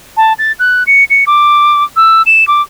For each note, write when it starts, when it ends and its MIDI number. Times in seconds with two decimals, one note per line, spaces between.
0.17 0.33 81
0.39 0.52 93
0.59 0.84 90
0.87 1.04 97
1.10 1.24 97
1.27 1.84 86
1.96 2.22 88
2.26 2.47 100
2.48 2.62 86